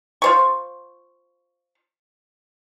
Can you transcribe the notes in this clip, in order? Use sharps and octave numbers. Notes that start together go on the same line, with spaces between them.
F4 C5 C#6